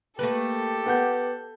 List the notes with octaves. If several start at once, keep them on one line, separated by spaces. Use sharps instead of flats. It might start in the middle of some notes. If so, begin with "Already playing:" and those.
A3 A#3 G4 A4 B4
B3 F#5 G6